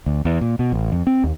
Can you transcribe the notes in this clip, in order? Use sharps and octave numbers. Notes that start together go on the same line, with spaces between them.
D2
E2
A#2
B2
A1
F2
C4
D#2